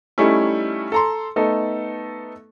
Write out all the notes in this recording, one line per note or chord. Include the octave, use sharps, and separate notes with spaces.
G3 A3 C#4 D#4 E4
A4 A#5 C6
A3 B3 D#4 A4